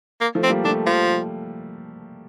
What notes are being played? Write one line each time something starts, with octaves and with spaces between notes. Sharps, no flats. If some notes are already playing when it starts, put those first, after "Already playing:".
A#3
F3 A3
C4
G3 A#3
F3 A3 D4
F3